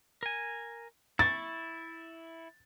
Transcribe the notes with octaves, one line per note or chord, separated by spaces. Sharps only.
A#4 G#5
E4 C#6 A6